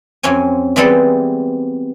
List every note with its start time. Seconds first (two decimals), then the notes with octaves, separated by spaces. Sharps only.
0.23 F2 F#3 C4 C#4 G#5
0.76 E3 G3 G#3 B3 C4 A4